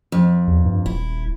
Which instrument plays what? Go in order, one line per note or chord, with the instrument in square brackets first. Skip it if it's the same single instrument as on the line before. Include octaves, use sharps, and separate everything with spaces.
[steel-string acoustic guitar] F2
[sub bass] E2
G2
[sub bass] D#1 [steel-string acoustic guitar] E4